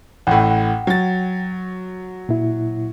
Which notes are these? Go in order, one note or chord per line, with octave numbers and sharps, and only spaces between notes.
A1 A2 F#5 G5
F#3 A6
A#2 E4